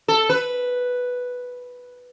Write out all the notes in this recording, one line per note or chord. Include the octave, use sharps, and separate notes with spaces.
A4
B4